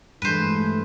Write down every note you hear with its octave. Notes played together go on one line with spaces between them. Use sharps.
G2 E3 G#3 A3 B4 C5